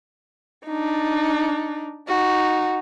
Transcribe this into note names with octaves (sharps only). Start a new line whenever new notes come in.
D4 D#4
D#4 F#4